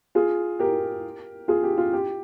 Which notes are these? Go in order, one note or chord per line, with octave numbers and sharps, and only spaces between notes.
F4 G#4
G4 A#4
F4 G#4
G4
F4
G4